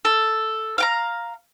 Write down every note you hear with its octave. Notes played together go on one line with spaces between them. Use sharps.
A4
F5 G5 A#5